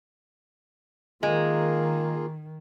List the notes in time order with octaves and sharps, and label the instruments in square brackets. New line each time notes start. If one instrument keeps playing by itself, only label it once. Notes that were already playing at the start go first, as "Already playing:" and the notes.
[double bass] D#3 [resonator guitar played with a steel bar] G#3 [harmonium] A#3 F4 G#4